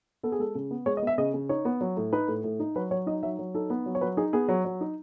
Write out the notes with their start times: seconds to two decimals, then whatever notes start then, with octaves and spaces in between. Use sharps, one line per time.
0.23 B3 A4
0.32 G#4
0.39 G#3 A4
0.55 C#3
0.71 B3
0.86 G#3 C#5
0.97 D#5
1.03 B3 E5
1.18 C#3 D#5
1.34 C#3
1.49 D#4 C#5
1.65 B3
1.81 F#3
1.97 A2
2.13 D#4 B4
2.28 A2
2.44 A2
2.60 D#4
2.76 F#3 B4
2.91 F#3 C#5
3.07 D#4 D#5
3.23 F#3 E5
3.39 F#3
3.54 D#4 A4
3.70 B3
3.86 F#3
3.95 C#5
4.01 F#3 B4
4.17 D#4 G#4
4.33 B3 G#4
4.48 F#3
4.65 F#3
4.81 D#4